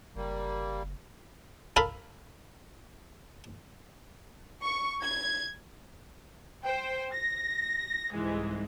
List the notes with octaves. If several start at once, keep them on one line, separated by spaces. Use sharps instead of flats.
F#1 G3 A#3
A4 A#4 F5 B5
C#6
G#6
C5 G5
A#6
C2 G#2 E3 G#3